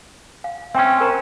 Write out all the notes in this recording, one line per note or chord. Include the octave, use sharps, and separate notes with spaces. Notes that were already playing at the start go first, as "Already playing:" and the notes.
F5
C4 C#4 E5 G5 C#6
A#4 C5 A#5